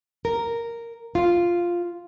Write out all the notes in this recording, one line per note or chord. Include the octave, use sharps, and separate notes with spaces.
A#4
F4